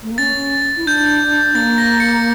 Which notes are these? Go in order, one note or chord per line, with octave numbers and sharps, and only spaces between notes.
A3
A#3
C#4 A6
E4
D4 G6
A#3 A6
A#6
C#7